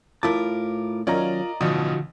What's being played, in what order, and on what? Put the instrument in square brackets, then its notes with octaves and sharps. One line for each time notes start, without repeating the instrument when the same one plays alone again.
[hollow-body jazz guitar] A2 E4 A5 [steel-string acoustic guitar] F4 A#4 [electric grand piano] D6
[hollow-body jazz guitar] D#2 F#3 C#4 [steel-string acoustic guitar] F4 A#4 [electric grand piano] D5 D#5 A#5
[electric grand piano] A1 B2 D#6 [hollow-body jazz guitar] D3 [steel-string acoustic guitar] F3 D#4 F#4